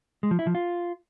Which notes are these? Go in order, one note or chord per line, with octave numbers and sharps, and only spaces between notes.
G#3
F3
E4
F3
F4